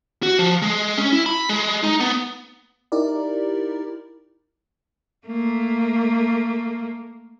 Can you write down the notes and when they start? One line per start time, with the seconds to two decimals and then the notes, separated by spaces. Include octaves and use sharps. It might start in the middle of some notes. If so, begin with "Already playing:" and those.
0.23 F#4
0.39 F3
0.62 G#3
0.97 C#4
1.12 E4
1.26 B5
1.49 G#3
1.84 D#4
2.00 B3
2.92 D#4 E4 G4 A#4 D5
5.27 A3 A#3